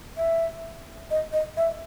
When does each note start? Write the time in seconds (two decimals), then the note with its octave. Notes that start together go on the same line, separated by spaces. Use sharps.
0.17 E5
1.11 D#5
1.33 D#5
1.57 E5